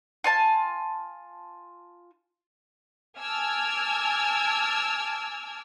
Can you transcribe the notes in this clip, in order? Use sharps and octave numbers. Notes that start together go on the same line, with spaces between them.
F4 G#5 A5
G#5 A5 D6 E6 F6 G#6